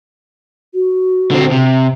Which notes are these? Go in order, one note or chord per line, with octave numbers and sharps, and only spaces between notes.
F#4
D3 C4
C3